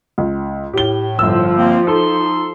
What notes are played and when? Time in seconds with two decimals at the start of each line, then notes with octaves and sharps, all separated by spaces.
0.18 C#2
0.74 A2 G4 G7
1.19 G1 F3 E6
1.57 A#3 C4
1.87 D#4 A4 C6